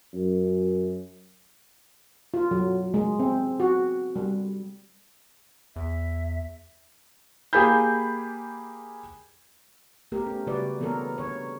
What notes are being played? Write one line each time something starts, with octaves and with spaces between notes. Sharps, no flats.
F#2
F4
F#3
G#3
C4
F#4
G3
E2 E5
A#3 G4 G#4 G#5 B5 G6
A3 B3 G4 A#4
C#4
C#3 G3 F#4 B4 D5
E3 B3 E4 A4 A#4 C#5
D3 C#5